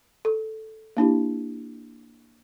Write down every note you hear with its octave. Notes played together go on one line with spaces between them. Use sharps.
A4
A#3 D4 E4 G4